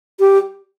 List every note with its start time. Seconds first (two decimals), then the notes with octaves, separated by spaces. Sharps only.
0.20 G4